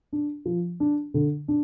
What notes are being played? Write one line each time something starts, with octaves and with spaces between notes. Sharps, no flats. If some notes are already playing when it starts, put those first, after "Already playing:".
D4
F3
D4
D3
D4